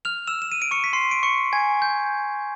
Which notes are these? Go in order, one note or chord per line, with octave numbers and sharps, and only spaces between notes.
F6 F7
E6 E7
E7
D#7
D7
C#6 C#7
B6
C6 C7
D7
C#6 C#7
G#5 G#6
G6